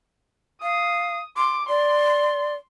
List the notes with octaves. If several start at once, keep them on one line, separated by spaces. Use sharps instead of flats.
F5 D#6
C6 D6
D5 C6